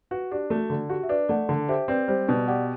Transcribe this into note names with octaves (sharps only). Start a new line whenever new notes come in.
F#4 B4
D4 G4
A3 F#4
D3
F#4 G4
E5
D4 B4 D5
A3 D5 F#5
D3
G4 C5 E5
C4 B4 D5
G3 C5
B2 B4 D5
G4 D5 F#5